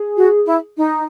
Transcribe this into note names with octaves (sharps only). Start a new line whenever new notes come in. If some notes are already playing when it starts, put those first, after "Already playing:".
Already playing: G#4
F#4
E4
D#4